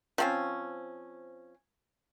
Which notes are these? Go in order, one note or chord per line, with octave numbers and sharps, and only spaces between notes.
F3 C4 C#4